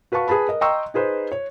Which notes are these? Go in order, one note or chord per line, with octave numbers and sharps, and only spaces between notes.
F#4 B4 F5 A5 C#6
G#4 B4 A5 B5
A#4 D#5
D#5 G5 A#5 C6 C#6 E6
D#4 G#4 B4 C5
C#5